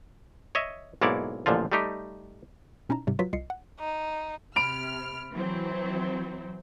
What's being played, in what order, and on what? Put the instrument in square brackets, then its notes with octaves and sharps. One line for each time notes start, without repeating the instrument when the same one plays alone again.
[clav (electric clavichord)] C#5 D#5 E5
B1 G#2 A#3 E4 C#5 D5
A1 A#2 D3 F3 F4
G3 A3 D#4 G4
[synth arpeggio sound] B2 C#4 D#4 E4 A5 A#5
G#2 C3 G3
F#3 F4 F#4 B4 B6
C2 F4 D#5 C7 C#7
F#5
[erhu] D#4
[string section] C3 F6 [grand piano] B5 D7 F7
[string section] E3 F#3 C4